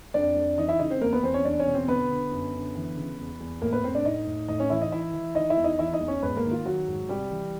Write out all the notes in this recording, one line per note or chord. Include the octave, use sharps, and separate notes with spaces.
F2 D4 D5
F2
E3 D#4 D#5
E4 E5
C#3 D#4 D#5
C4 C5
E2 A#3 A#4
B3 B4
E2 C4 C5
C#4 C#5
E2 D4 D5
C#4 C#5
B2
C4 C5
D3 B3 B4
D3
F#2
D3
E3
C#3
E2
E2
A2 A#3 A#4
B3 B4
A2 C4 C5
D4 D5
A2 D#4 D#5
A2
A2 D#4 D#5
C#4 C#5
E3 E4 E5
D#4 D#5
E3 E4 E5
E3
E3 D#4 D#5
E4 E5
E2
D#4 D#5
E3 E4 E5
D#4 D#5
E2
C#4 C#5
G#2 B3 B4
A#3 A#4
D#3
F4
D#3 F#3 F#4
G#2
C3 G3 G4
E3